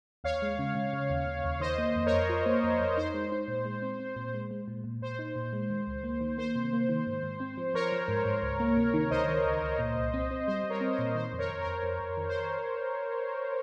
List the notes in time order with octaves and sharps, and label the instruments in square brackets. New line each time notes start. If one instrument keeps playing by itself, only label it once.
[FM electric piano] D#2 [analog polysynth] C#5 F5
[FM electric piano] G#3
C#3
C#3
C#3
D#2
C#3
D#2
[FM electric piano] D#3 [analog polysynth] C5 D#5
[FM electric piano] A#3
F2
[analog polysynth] A#4 C#5
[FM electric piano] F2
F4
A#3
F2
F2
[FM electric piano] D#4 [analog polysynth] C5
[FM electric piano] G#3
D#4
A#2
G#3
C4
C4
A#2
G#3
G#3
A#2
A#2
[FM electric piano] A#2 [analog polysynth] C5
[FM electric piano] D#4
A#2
G#3
D#3
C#2
A#3
D#3
[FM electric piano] A#3 [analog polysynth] C5
[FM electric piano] C3
A#3
D#3
G#2
G#2
C4
F3
[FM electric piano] F3 [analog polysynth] A#4 C#5
[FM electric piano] F3
G#2
G#2
C#2
A#3
C3
D#3
[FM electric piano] C#2 [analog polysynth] C5 D#5
[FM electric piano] D#3
C#2
C#2
A#2
C2
C4
C4
[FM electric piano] G3 [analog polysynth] C5
[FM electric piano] G3
[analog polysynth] A#4 C#5
[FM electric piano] C4
[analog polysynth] C5
[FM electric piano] A#2
[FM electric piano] D#3 [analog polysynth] C5
[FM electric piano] F2
[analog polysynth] A#4 C#5
[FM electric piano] F2
[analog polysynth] A#4
[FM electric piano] F2
F2
F2
D#3
[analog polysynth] C5